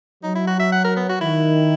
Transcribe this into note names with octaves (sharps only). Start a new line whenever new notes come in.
F#3 D#4
E4
F#4
E5
F#5
A#4
B3
F#4
D#3 E4